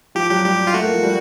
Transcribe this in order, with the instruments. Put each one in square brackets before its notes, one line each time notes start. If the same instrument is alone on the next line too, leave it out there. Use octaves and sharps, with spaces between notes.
[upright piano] F3 [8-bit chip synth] G4
[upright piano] F#3 [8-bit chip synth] G4
[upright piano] G3 [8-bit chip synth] G4
[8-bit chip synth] F4
[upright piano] A3 [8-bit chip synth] F#4
[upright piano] A#3
F3
G3